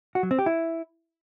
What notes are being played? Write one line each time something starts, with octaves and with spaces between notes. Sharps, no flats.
F#4
F#3
C4
G4
E4